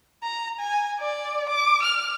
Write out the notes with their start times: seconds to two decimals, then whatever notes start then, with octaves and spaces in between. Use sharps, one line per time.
0.23 A#5
0.59 G#5
1.00 D5
1.49 D6
1.82 F6